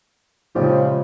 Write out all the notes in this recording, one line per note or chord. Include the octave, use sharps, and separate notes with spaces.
A#1 C#3 F3 G#3 G4